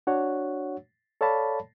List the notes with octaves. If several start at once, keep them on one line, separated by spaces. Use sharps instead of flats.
D4 F#4 C#5 F#5
A4 C#5 D5 F5 A5 B5